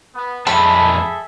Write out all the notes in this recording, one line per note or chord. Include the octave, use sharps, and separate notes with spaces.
B3
F2 G#3 G#4 A4 E5 A5 B5